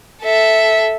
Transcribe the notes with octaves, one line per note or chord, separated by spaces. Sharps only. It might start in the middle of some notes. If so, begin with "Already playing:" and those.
A4 E5